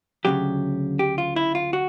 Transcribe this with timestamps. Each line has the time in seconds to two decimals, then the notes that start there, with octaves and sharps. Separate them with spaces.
0.25 D2 C#3 F#3 G4
0.99 G4
1.18 F4
1.36 E4
1.55 F4
1.73 F#4